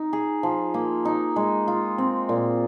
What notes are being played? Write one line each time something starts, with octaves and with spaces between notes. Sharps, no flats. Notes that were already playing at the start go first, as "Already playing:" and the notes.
Already playing: D#4
G#4
F3
A#3
D#4
G#3
F4
C4
A#2